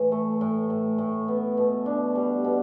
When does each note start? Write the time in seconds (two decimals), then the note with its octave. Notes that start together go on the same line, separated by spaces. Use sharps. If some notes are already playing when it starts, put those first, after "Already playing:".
Already playing: A2 E3
0.12 A3
0.41 A2
0.70 A2
0.98 A2
1.28 B3
1.57 B2
1.86 D4
2.15 G3
2.44 B2